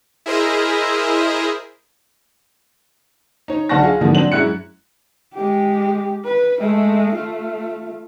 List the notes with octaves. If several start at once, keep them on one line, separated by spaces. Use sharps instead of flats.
E4 G#4 A#4 C5 D#5 E5
D#4 C#5
B1 D4 F#5 A5 C#6 A#6
F4 G#4
G#2 B2 D3 E3 F3 A#3
F#3 C4 D4 F#7
F#2 G#3 E4 F#6 C#7
G#3 G4
B4
G#3 A3
A3 F4